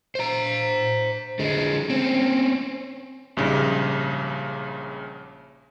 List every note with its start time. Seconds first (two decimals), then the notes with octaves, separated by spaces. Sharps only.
0.15 C5 A#5
1.39 D3 G#3
1.90 C4 C#4
3.37 A#1 G#2 C#3 G3